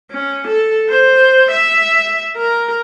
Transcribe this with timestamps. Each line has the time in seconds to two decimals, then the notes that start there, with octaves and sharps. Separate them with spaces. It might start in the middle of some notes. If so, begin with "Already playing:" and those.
0.11 C#4
0.48 A4
0.89 C5
1.51 E5
2.37 A#4